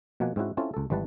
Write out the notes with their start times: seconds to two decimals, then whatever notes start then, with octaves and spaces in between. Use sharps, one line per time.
0.20 B2 F3 A#3 F#5 G#5
0.36 G#2 C4 C#4 E4 F#4
0.57 C4 C#4 E4 F4 A4
0.74 C#2 A4
0.90 G#1 E3 G3 B4 A5